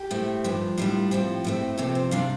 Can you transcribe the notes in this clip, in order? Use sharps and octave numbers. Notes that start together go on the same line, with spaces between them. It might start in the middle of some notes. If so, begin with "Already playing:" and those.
Already playing: G4
A2 A3 C4
G2 F3 D4
A2 G3 D4 F4
A2 F3 C4 G4
A2 A3 C4
C3 F3 C4 A4
C5
C3 G3 D4 F5